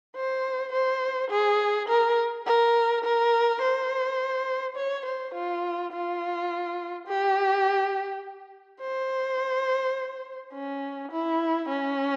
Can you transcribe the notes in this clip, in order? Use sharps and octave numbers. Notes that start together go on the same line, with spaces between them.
C5
C5
G#4
A#4
A#4
A#4
C5
C#5
C5
F4
F4
G4
C5
C#4
E4
C#4